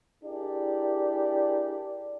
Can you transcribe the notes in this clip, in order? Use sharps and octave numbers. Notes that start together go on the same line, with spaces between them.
D4 E4 G4 G#4 A#4 D5